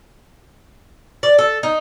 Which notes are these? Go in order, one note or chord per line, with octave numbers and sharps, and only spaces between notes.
D5
A4
D#4